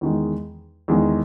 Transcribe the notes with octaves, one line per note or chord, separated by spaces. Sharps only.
E2 D#3 G#3
E2 D#3 G#3